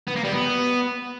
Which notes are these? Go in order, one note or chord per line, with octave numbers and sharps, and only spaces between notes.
B3
A#3
G3
B3